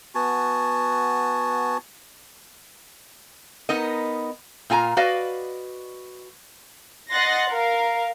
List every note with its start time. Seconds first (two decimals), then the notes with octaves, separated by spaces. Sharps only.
0.15 B3 F#4 G#5 A5
3.69 B3 D#4 A#4 D#5
4.70 A#2 F4 G#5 A#5
4.97 F#4 B4 D5 D#5 F5
7.10 D#5 F#5 C6 F#6 A6 A#6
7.49 A#4 F5